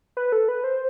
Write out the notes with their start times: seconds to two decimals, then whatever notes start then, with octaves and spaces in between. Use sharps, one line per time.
0.17 B4
0.32 A4
0.49 B4
0.64 C5